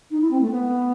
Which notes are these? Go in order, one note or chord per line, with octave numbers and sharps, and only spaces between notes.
D#4
E4
C4
A3
B3